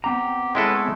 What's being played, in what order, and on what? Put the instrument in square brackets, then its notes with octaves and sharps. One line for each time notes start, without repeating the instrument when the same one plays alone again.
[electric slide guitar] B3 C4 A#5 [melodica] G4
[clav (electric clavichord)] G#3 E4 A4 [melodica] C#4 B4
[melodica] A3